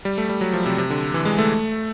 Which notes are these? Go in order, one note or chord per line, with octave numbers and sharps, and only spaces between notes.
G3
A3
G3
F#3
F3
C3
C3
D3
E3
G#3
A3